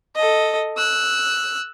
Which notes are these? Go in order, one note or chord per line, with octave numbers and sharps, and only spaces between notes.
A4 D#5
E6 F#6